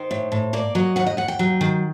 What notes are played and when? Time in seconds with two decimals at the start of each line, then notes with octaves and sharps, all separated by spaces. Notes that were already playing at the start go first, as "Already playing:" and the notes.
Already playing: D#3 C5
0.11 A2
0.32 A2
0.53 A#3 D5
0.75 F#3 D#5
0.96 D#2 F#5
1.07 D#5
1.17 D#2 F#5
1.28 G5
1.39 F#3
1.61 D#3